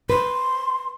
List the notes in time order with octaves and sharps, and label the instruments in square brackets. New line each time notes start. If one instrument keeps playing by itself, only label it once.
[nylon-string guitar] B4 [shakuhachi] C6